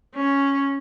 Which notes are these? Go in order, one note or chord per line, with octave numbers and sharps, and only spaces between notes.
C#4